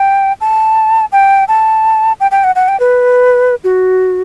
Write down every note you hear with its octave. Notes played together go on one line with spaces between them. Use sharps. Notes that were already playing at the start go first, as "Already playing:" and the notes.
Already playing: G5
A5
G5
A5
G5
G5
F#5
F#5
G5
B4
F#4